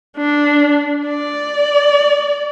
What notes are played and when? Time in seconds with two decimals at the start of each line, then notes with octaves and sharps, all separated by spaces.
0.17 D4
1.06 D5